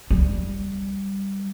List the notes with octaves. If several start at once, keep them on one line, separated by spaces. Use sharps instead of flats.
G3